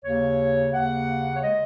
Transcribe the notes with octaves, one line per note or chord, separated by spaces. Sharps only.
D#2 C#3 A#3 C#5
D#2 C#3 A#3 F#5
C#5
C#3 G#3 D#5